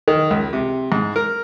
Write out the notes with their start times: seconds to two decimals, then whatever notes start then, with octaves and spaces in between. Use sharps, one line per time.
0.08 D#3
0.31 C#2
0.53 C3
0.92 G#2
1.16 A#4